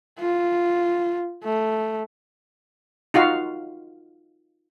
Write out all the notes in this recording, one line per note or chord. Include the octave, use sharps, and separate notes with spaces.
F4
A3
D#4 F4 F#4 F5